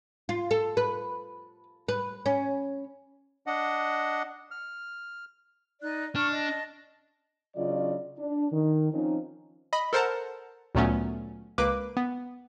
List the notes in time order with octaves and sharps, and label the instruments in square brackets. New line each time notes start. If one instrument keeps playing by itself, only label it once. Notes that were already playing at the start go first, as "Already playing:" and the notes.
[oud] F4
A4
B4
B4
C#4
[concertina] D4 D#5 F#5
F6
[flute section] D#4 D5 F#6
[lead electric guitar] D4 [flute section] C#6 F6
[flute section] D#5 A5
[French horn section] C#3 F#3 D4 F4 D5 D#5
D4
D#3
F3 C4 C#4 D#4
[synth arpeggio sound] D#5 B5
A4 A#4 C5 F#5 A5 A#5
D2 A#2 F#3 A3 B3 C#4
C#2 A#3 B4 D6
B3